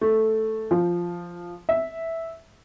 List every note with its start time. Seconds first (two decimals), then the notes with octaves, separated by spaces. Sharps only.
0.01 A3
0.71 F3
1.69 E5